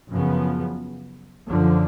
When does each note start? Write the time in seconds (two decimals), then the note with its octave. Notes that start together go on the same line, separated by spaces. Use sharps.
0.12 F#2 C#3 F3 B3
1.48 F#2 D3 F3